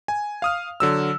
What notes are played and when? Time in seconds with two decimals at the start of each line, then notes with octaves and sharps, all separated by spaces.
0.08 G#5
0.42 F5 D#6 F6
0.80 D3 F#3 E6